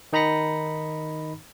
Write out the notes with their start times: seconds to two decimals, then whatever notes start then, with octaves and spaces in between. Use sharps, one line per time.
0.13 D#3 D#4 A#5 B5 A#6 C#7